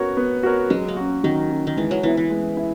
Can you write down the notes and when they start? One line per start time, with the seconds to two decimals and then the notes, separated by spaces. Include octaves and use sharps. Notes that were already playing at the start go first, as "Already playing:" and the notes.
Already playing: B3 F#4 A#4 C#5
0.17 B3
0.43 F#4 A#4 C#5
0.70 F#3 G#3
0.88 A#3
0.97 C#4 F#4
1.24 D#3 F#3
1.50 C#4 F#4
1.67 D#3
1.76 E3 G#3
1.91 F#3
2.03 E3 B3 E4
2.17 E3
2.30 G#3
2.57 E4